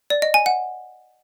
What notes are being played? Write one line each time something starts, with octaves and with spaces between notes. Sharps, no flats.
D5
D#5
G#5
F#5